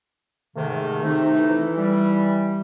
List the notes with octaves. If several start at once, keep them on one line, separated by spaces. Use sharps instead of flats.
G#2 C3 D#3 A3
C3 A3 D#4
E3
G3